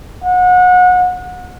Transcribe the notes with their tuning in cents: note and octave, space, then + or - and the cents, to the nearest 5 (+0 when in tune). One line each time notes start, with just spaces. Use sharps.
F#5 -30